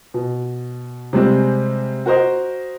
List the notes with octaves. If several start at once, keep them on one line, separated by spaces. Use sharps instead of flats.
B2
C3 G3 G#3 C4
F#4 A#4 C5 D#5